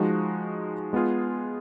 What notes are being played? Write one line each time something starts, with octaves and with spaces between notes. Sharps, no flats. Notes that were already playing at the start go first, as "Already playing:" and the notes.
Already playing: F3 G#3 D#4 F#4
G#3 B3 F4 G#4